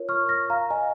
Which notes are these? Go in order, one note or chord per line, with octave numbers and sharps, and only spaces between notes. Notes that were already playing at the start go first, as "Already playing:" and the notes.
Already playing: F4 A#4 C#5
C#6 F6
F6 A#6
F5 A#5
D#5 G#5